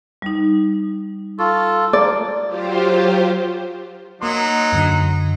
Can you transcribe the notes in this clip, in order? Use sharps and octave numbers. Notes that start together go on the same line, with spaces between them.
G3 D#4
F4 A4 C#6
A#3 D5
F#3 F4 G4 C5
F#3 A#3 D#4 C6
F#2 D3